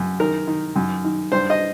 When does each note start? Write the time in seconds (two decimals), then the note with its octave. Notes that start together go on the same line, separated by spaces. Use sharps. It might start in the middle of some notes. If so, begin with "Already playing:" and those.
Already playing: F#2
0.20 D#3 A#4
0.47 D#3
0.76 F#2
1.04 D#3
1.32 G2 C5
1.50 D#5